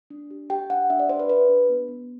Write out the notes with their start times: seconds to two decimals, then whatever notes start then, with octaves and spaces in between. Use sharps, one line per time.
0.10 D4
0.31 G4
0.50 G4 G5
0.70 D4 F#5
0.90 D4 E5
0.99 D5
1.09 G4 C5
1.19 B4
1.29 G4 B4
1.49 D4
1.69 B3
1.88 B3